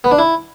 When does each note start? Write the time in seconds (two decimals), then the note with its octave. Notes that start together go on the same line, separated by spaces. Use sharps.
0.04 B3
0.11 D4
0.18 E4